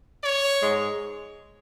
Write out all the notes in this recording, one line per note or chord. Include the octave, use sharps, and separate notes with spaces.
C#5
G#2 G#3